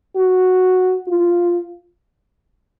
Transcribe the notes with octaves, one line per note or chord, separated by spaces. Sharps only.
F#4
F4